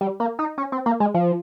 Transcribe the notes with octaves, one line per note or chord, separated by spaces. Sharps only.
G3
A#3
D#4
C#4
C4
A#3
G#3
F3